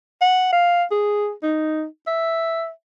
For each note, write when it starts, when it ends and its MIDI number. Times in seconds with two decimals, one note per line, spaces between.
0.22 0.48 78
0.53 0.84 77
0.91 1.32 68
1.43 1.85 63
2.07 2.70 76